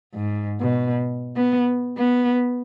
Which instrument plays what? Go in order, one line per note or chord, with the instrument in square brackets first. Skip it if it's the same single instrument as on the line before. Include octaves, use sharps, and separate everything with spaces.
[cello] G#2
B2
B3
B3